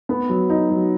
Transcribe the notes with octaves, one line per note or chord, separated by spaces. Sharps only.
B3
F#3
D#4
F#3